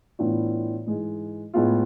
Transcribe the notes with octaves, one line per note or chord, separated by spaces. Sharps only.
A2 E3 B3 D4 F4
G#2 E3 G#3
A2 G#3 B3 F4